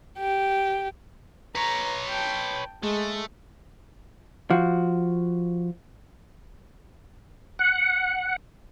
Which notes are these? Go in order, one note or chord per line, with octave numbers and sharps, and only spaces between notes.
G4
B4 C#5 A#5
G5 A5
G#3 A3
F3 F#4
F#5